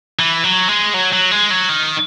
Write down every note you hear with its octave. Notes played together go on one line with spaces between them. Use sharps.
E3
F#3
G#3
F#3
F#3
G#3
F#3
D#3